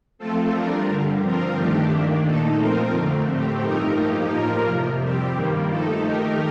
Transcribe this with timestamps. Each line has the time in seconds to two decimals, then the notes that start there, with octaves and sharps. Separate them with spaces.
0.18 F3 A3 C4 F4 A4
0.53 G3 D4 F4 A#4
0.87 G2 D3 G3
1.21 F3 C4 F4 A#4
1.56 G2 D#3 A3 D4 G4
1.90 D#3 A#3 D4
2.24 A#2 A3 D#4 A4
2.58 F3 C4 F4 A#4
2.93 F2 D3 A3 C4
3.28 A2 A3 C4 G4
3.61 G2 F3 A3 D#4 A#4
3.95 F3 A#3 D#4 G4
4.30 A2 F3 A#3 F4 A#4
4.64 F2 C3 F3
5.00 G3 C4 G4
5.33 G2 D#3 G3 A#3
5.68 F3 A3 D#4 A4
6.02 D#3 A3 D#4 G4 A#4